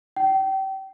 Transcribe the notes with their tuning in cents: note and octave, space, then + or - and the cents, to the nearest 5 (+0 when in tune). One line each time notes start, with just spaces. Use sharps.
G5 -30